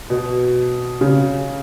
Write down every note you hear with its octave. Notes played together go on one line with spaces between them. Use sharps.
B2
C#3